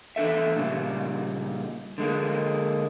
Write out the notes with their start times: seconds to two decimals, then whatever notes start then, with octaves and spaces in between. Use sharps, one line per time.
0.16 E2 D4 A4 E5
0.56 A#2 C#3 G3
1.98 D3 G#3 A#3